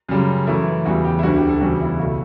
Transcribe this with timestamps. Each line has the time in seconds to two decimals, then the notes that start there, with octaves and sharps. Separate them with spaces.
0.09 F#2 C#3 G3
0.47 F#2 E3 A3 E4
0.85 E2 C#3 G3 F#4
1.05 G4
1.19 E4
1.23 D2 D3 G3 F#4
1.36 G4
1.49 A4
1.61 E2 C#3 G3 F#4
1.81 E4
1.99 C#2 B2 A3 F#4